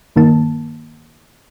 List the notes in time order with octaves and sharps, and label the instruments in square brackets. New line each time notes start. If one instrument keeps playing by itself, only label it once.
[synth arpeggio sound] G2 D#3 A#3 A5